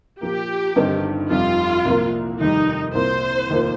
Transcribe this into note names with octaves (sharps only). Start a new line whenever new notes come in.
A#2 F3 A#3 G4
G1 G2 D#3 C4 D#4
F1 F2 C3 G3 F4
C2 A#2 F3 A#3
F1 D#2 D#3 G3 D#4
C2 A#2 A#3 C5
F1 D#2 D#3 A#3 F4